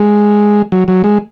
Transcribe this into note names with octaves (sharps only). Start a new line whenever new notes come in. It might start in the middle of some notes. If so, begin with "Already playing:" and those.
Already playing: G#3
F#3
F#3
G#3